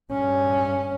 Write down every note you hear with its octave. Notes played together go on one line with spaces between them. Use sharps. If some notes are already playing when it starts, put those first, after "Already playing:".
G2 C#4